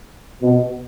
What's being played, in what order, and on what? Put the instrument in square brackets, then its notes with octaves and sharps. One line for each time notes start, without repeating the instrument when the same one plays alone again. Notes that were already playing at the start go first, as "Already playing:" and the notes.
[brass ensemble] B2